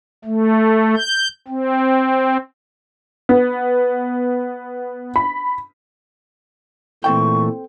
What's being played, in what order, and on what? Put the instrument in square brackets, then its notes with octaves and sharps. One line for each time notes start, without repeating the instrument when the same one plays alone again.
[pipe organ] A3
G6
C4
[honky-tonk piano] B3
B5
[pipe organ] A#2 E3 A3 [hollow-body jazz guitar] C4 A4 G5 [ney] C#6